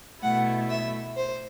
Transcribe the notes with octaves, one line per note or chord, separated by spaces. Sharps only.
B2 A3 E4 F#5
E5
C5